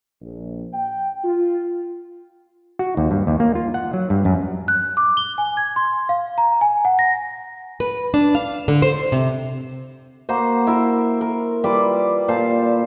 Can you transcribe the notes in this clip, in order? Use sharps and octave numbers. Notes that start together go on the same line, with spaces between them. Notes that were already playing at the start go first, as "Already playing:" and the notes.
A#1
G5
F4
F#4
D#2
G2
D#2
A#3
F4
F#5
F#3
G2
F#2
F#6
D6
G7
G#5
G#6
C6
F5
A#5
G#5
F#5
A#6
B4
D4
F5
D3
C5
C3
A#3 F#4 C5
E4 A#4
A#4
G3 F4 B4 D6
A#2 C5 F5 A5